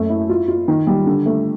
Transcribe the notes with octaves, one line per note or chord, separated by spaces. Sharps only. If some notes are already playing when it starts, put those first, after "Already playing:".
Already playing: F#2 A3
E4
F4
F4
D#3
G3
D3
A3